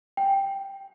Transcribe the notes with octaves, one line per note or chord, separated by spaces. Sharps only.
G5